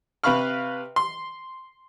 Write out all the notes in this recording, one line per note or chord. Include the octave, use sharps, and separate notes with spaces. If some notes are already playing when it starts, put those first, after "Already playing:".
C3 B4 F5 B5 C#6 F6
C6